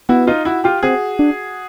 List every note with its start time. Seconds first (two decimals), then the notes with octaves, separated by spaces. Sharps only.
0.09 B3 E4 F#4
0.27 D#4 F4
0.45 E4 F#4
0.64 F4 G4
0.83 C4 F#4 G#4
1.19 D4